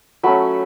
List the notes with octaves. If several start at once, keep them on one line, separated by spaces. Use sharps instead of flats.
F#3 A3 C#4 B5